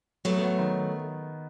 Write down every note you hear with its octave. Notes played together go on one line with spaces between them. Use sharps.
F#3 A3 B3
B3
D#3